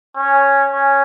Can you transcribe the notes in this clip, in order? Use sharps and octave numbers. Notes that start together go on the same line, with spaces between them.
C#4
C#4